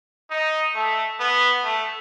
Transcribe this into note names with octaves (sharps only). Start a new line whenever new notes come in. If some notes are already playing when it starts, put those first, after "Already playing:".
D#4
A3
B3
A3